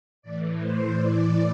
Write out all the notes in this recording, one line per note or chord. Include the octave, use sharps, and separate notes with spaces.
A2 E3 D5
C5
A2 E3 D5